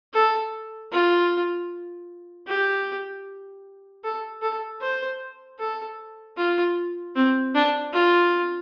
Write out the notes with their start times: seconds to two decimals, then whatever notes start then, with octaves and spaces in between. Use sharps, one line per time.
0.13 A4
0.92 F4
2.47 G4
4.04 A4
4.42 A4
4.81 C5
5.59 A4
6.37 F4
7.16 C4
7.55 D4
7.93 F4